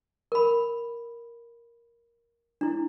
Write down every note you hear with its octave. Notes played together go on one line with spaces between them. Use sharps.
A#4 B5
D4 E4